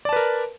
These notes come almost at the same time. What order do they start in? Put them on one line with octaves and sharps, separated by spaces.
D5 A5 B4 A#4